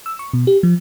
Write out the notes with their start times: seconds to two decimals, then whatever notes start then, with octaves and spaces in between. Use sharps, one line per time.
0.06 E6
0.19 C#6
0.33 B2
0.47 G4
0.63 F3